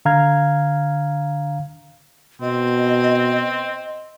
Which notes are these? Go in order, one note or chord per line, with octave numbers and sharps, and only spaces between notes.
D3 F5 A#5 F6 G#6
B2 C4 D#5